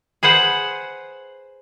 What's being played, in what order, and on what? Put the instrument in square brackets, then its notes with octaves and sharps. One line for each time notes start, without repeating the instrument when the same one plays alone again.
[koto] G#4 B4 C5 F#5